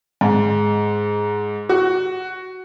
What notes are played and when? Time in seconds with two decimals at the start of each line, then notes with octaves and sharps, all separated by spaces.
0.21 G#2
1.69 F#4